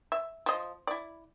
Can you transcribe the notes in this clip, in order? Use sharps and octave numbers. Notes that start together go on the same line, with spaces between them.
E5
F3 D#5
E4 D5